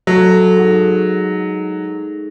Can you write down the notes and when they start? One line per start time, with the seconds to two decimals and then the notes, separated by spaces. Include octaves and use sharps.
0.07 F#3 A3
0.56 G#2